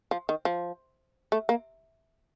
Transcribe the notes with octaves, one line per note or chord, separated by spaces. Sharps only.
F3
D#3
F3
A3
A#3